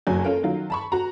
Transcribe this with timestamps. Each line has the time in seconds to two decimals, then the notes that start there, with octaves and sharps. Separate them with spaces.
0.07 F#1 F#3 G#5
0.24 C#4 F4 A4 A#4
0.43 D#3 F#3 F4
0.70 A5 B5 C#6
0.92 F#4 A#5